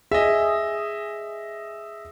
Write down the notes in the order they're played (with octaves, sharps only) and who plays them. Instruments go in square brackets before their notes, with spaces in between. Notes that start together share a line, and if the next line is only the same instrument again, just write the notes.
[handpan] G#4 [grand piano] D#5 E5